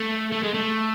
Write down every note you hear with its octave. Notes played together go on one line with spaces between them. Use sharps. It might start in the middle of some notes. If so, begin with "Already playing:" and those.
Already playing: A3
A3
G#3
A3